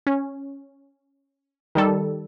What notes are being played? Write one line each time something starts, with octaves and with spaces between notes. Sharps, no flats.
C#4
D#3 G3 A4